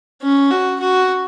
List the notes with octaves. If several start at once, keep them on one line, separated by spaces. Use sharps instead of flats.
C#4
F#4
F#4